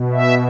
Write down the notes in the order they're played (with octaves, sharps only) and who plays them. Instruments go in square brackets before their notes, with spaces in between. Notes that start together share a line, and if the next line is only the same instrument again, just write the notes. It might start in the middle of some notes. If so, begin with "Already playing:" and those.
Already playing: [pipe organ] B2
E5